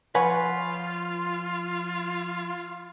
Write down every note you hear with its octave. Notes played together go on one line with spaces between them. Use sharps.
F3 F4 B4 C#5 F#5 G#5